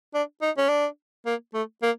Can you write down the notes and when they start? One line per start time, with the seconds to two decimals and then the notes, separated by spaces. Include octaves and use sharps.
0.14 D4
0.42 D#4
0.58 C#4
0.69 D4
1.26 A#3
1.54 A3
1.82 A#3